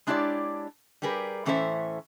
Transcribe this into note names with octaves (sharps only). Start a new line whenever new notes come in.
G#3 D4 E4 G4 C#5 D5
G3 G4 G#4 A#4 B4
A2 E3 C#4 A4 C5 E5